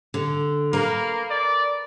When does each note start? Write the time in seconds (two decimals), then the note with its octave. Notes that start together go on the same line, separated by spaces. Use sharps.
0.14 D3
0.73 A#3 A#4 B4
1.31 D5